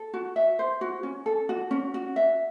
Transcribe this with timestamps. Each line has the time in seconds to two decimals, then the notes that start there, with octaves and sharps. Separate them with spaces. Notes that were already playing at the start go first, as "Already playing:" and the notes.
Already playing: A4
0.14 F#4
0.36 E5
0.59 C5
0.81 F#4
1.03 C#4
1.26 A4
1.49 F#4
1.71 C#4
1.94 F#4
2.16 E5